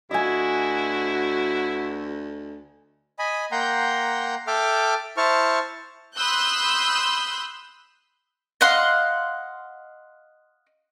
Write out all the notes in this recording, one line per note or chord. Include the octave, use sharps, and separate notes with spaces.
D2 E4 F#4 D#5 G#5
D#5 G#5 B5
A#3 F#5 G5 A#5 C6 G6
A4 E5 G5 D6 F6
E4 C5 A5 C#6 F6
B5 C6 D#6 E6 F#6 G6
D#5 F5 F#5 C6